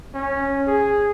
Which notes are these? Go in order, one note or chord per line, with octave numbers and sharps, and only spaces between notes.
C#4
G#4